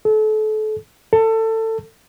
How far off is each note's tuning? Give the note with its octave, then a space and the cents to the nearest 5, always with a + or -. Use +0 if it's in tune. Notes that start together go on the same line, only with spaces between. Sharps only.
A4 -30
A4 +25